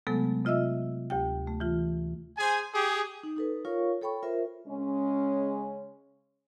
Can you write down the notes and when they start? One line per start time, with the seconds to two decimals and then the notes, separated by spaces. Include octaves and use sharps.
0.07 C3 F#3 G#3 A3 B3 A4
0.45 C3 F4 D#5 E5 E6
1.10 D2 G4 G5
1.47 A3
1.60 E3 F4
2.37 G#4 C5 G#5
2.74 G4 G#4
3.23 D#4
3.37 D#4 A4 B4
3.65 F4 A#4 C#5 F5 C#6
4.01 A4 C#5 G5 B5 C#6
4.23 F4 A#4 C5 E5
4.67 C#3 G#3 C#4